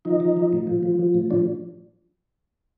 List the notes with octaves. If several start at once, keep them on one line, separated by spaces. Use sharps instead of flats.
F3 D#4
F3
F3
A2
F3
F3
F3
A2
F3 D4